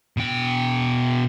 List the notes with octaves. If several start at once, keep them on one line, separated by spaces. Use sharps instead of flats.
B2 G5